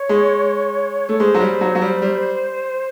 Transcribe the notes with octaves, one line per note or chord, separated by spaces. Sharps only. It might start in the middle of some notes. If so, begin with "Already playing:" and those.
Already playing: C#5
G#3
A3
G#3 C5
F#3
G3
F#3
F#3
G3
G3